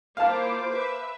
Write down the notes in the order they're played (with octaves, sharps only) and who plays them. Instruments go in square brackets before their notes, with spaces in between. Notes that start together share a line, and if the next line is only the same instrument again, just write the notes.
[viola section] A#3 E4 F4 [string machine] C5 D6 [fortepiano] F5 A5
[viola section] B4 E5